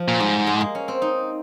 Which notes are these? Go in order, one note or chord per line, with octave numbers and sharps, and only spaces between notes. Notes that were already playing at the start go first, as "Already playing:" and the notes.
Already playing: F3
A#2
G#2 G3
G#3
A#3
C#4
C4
D#4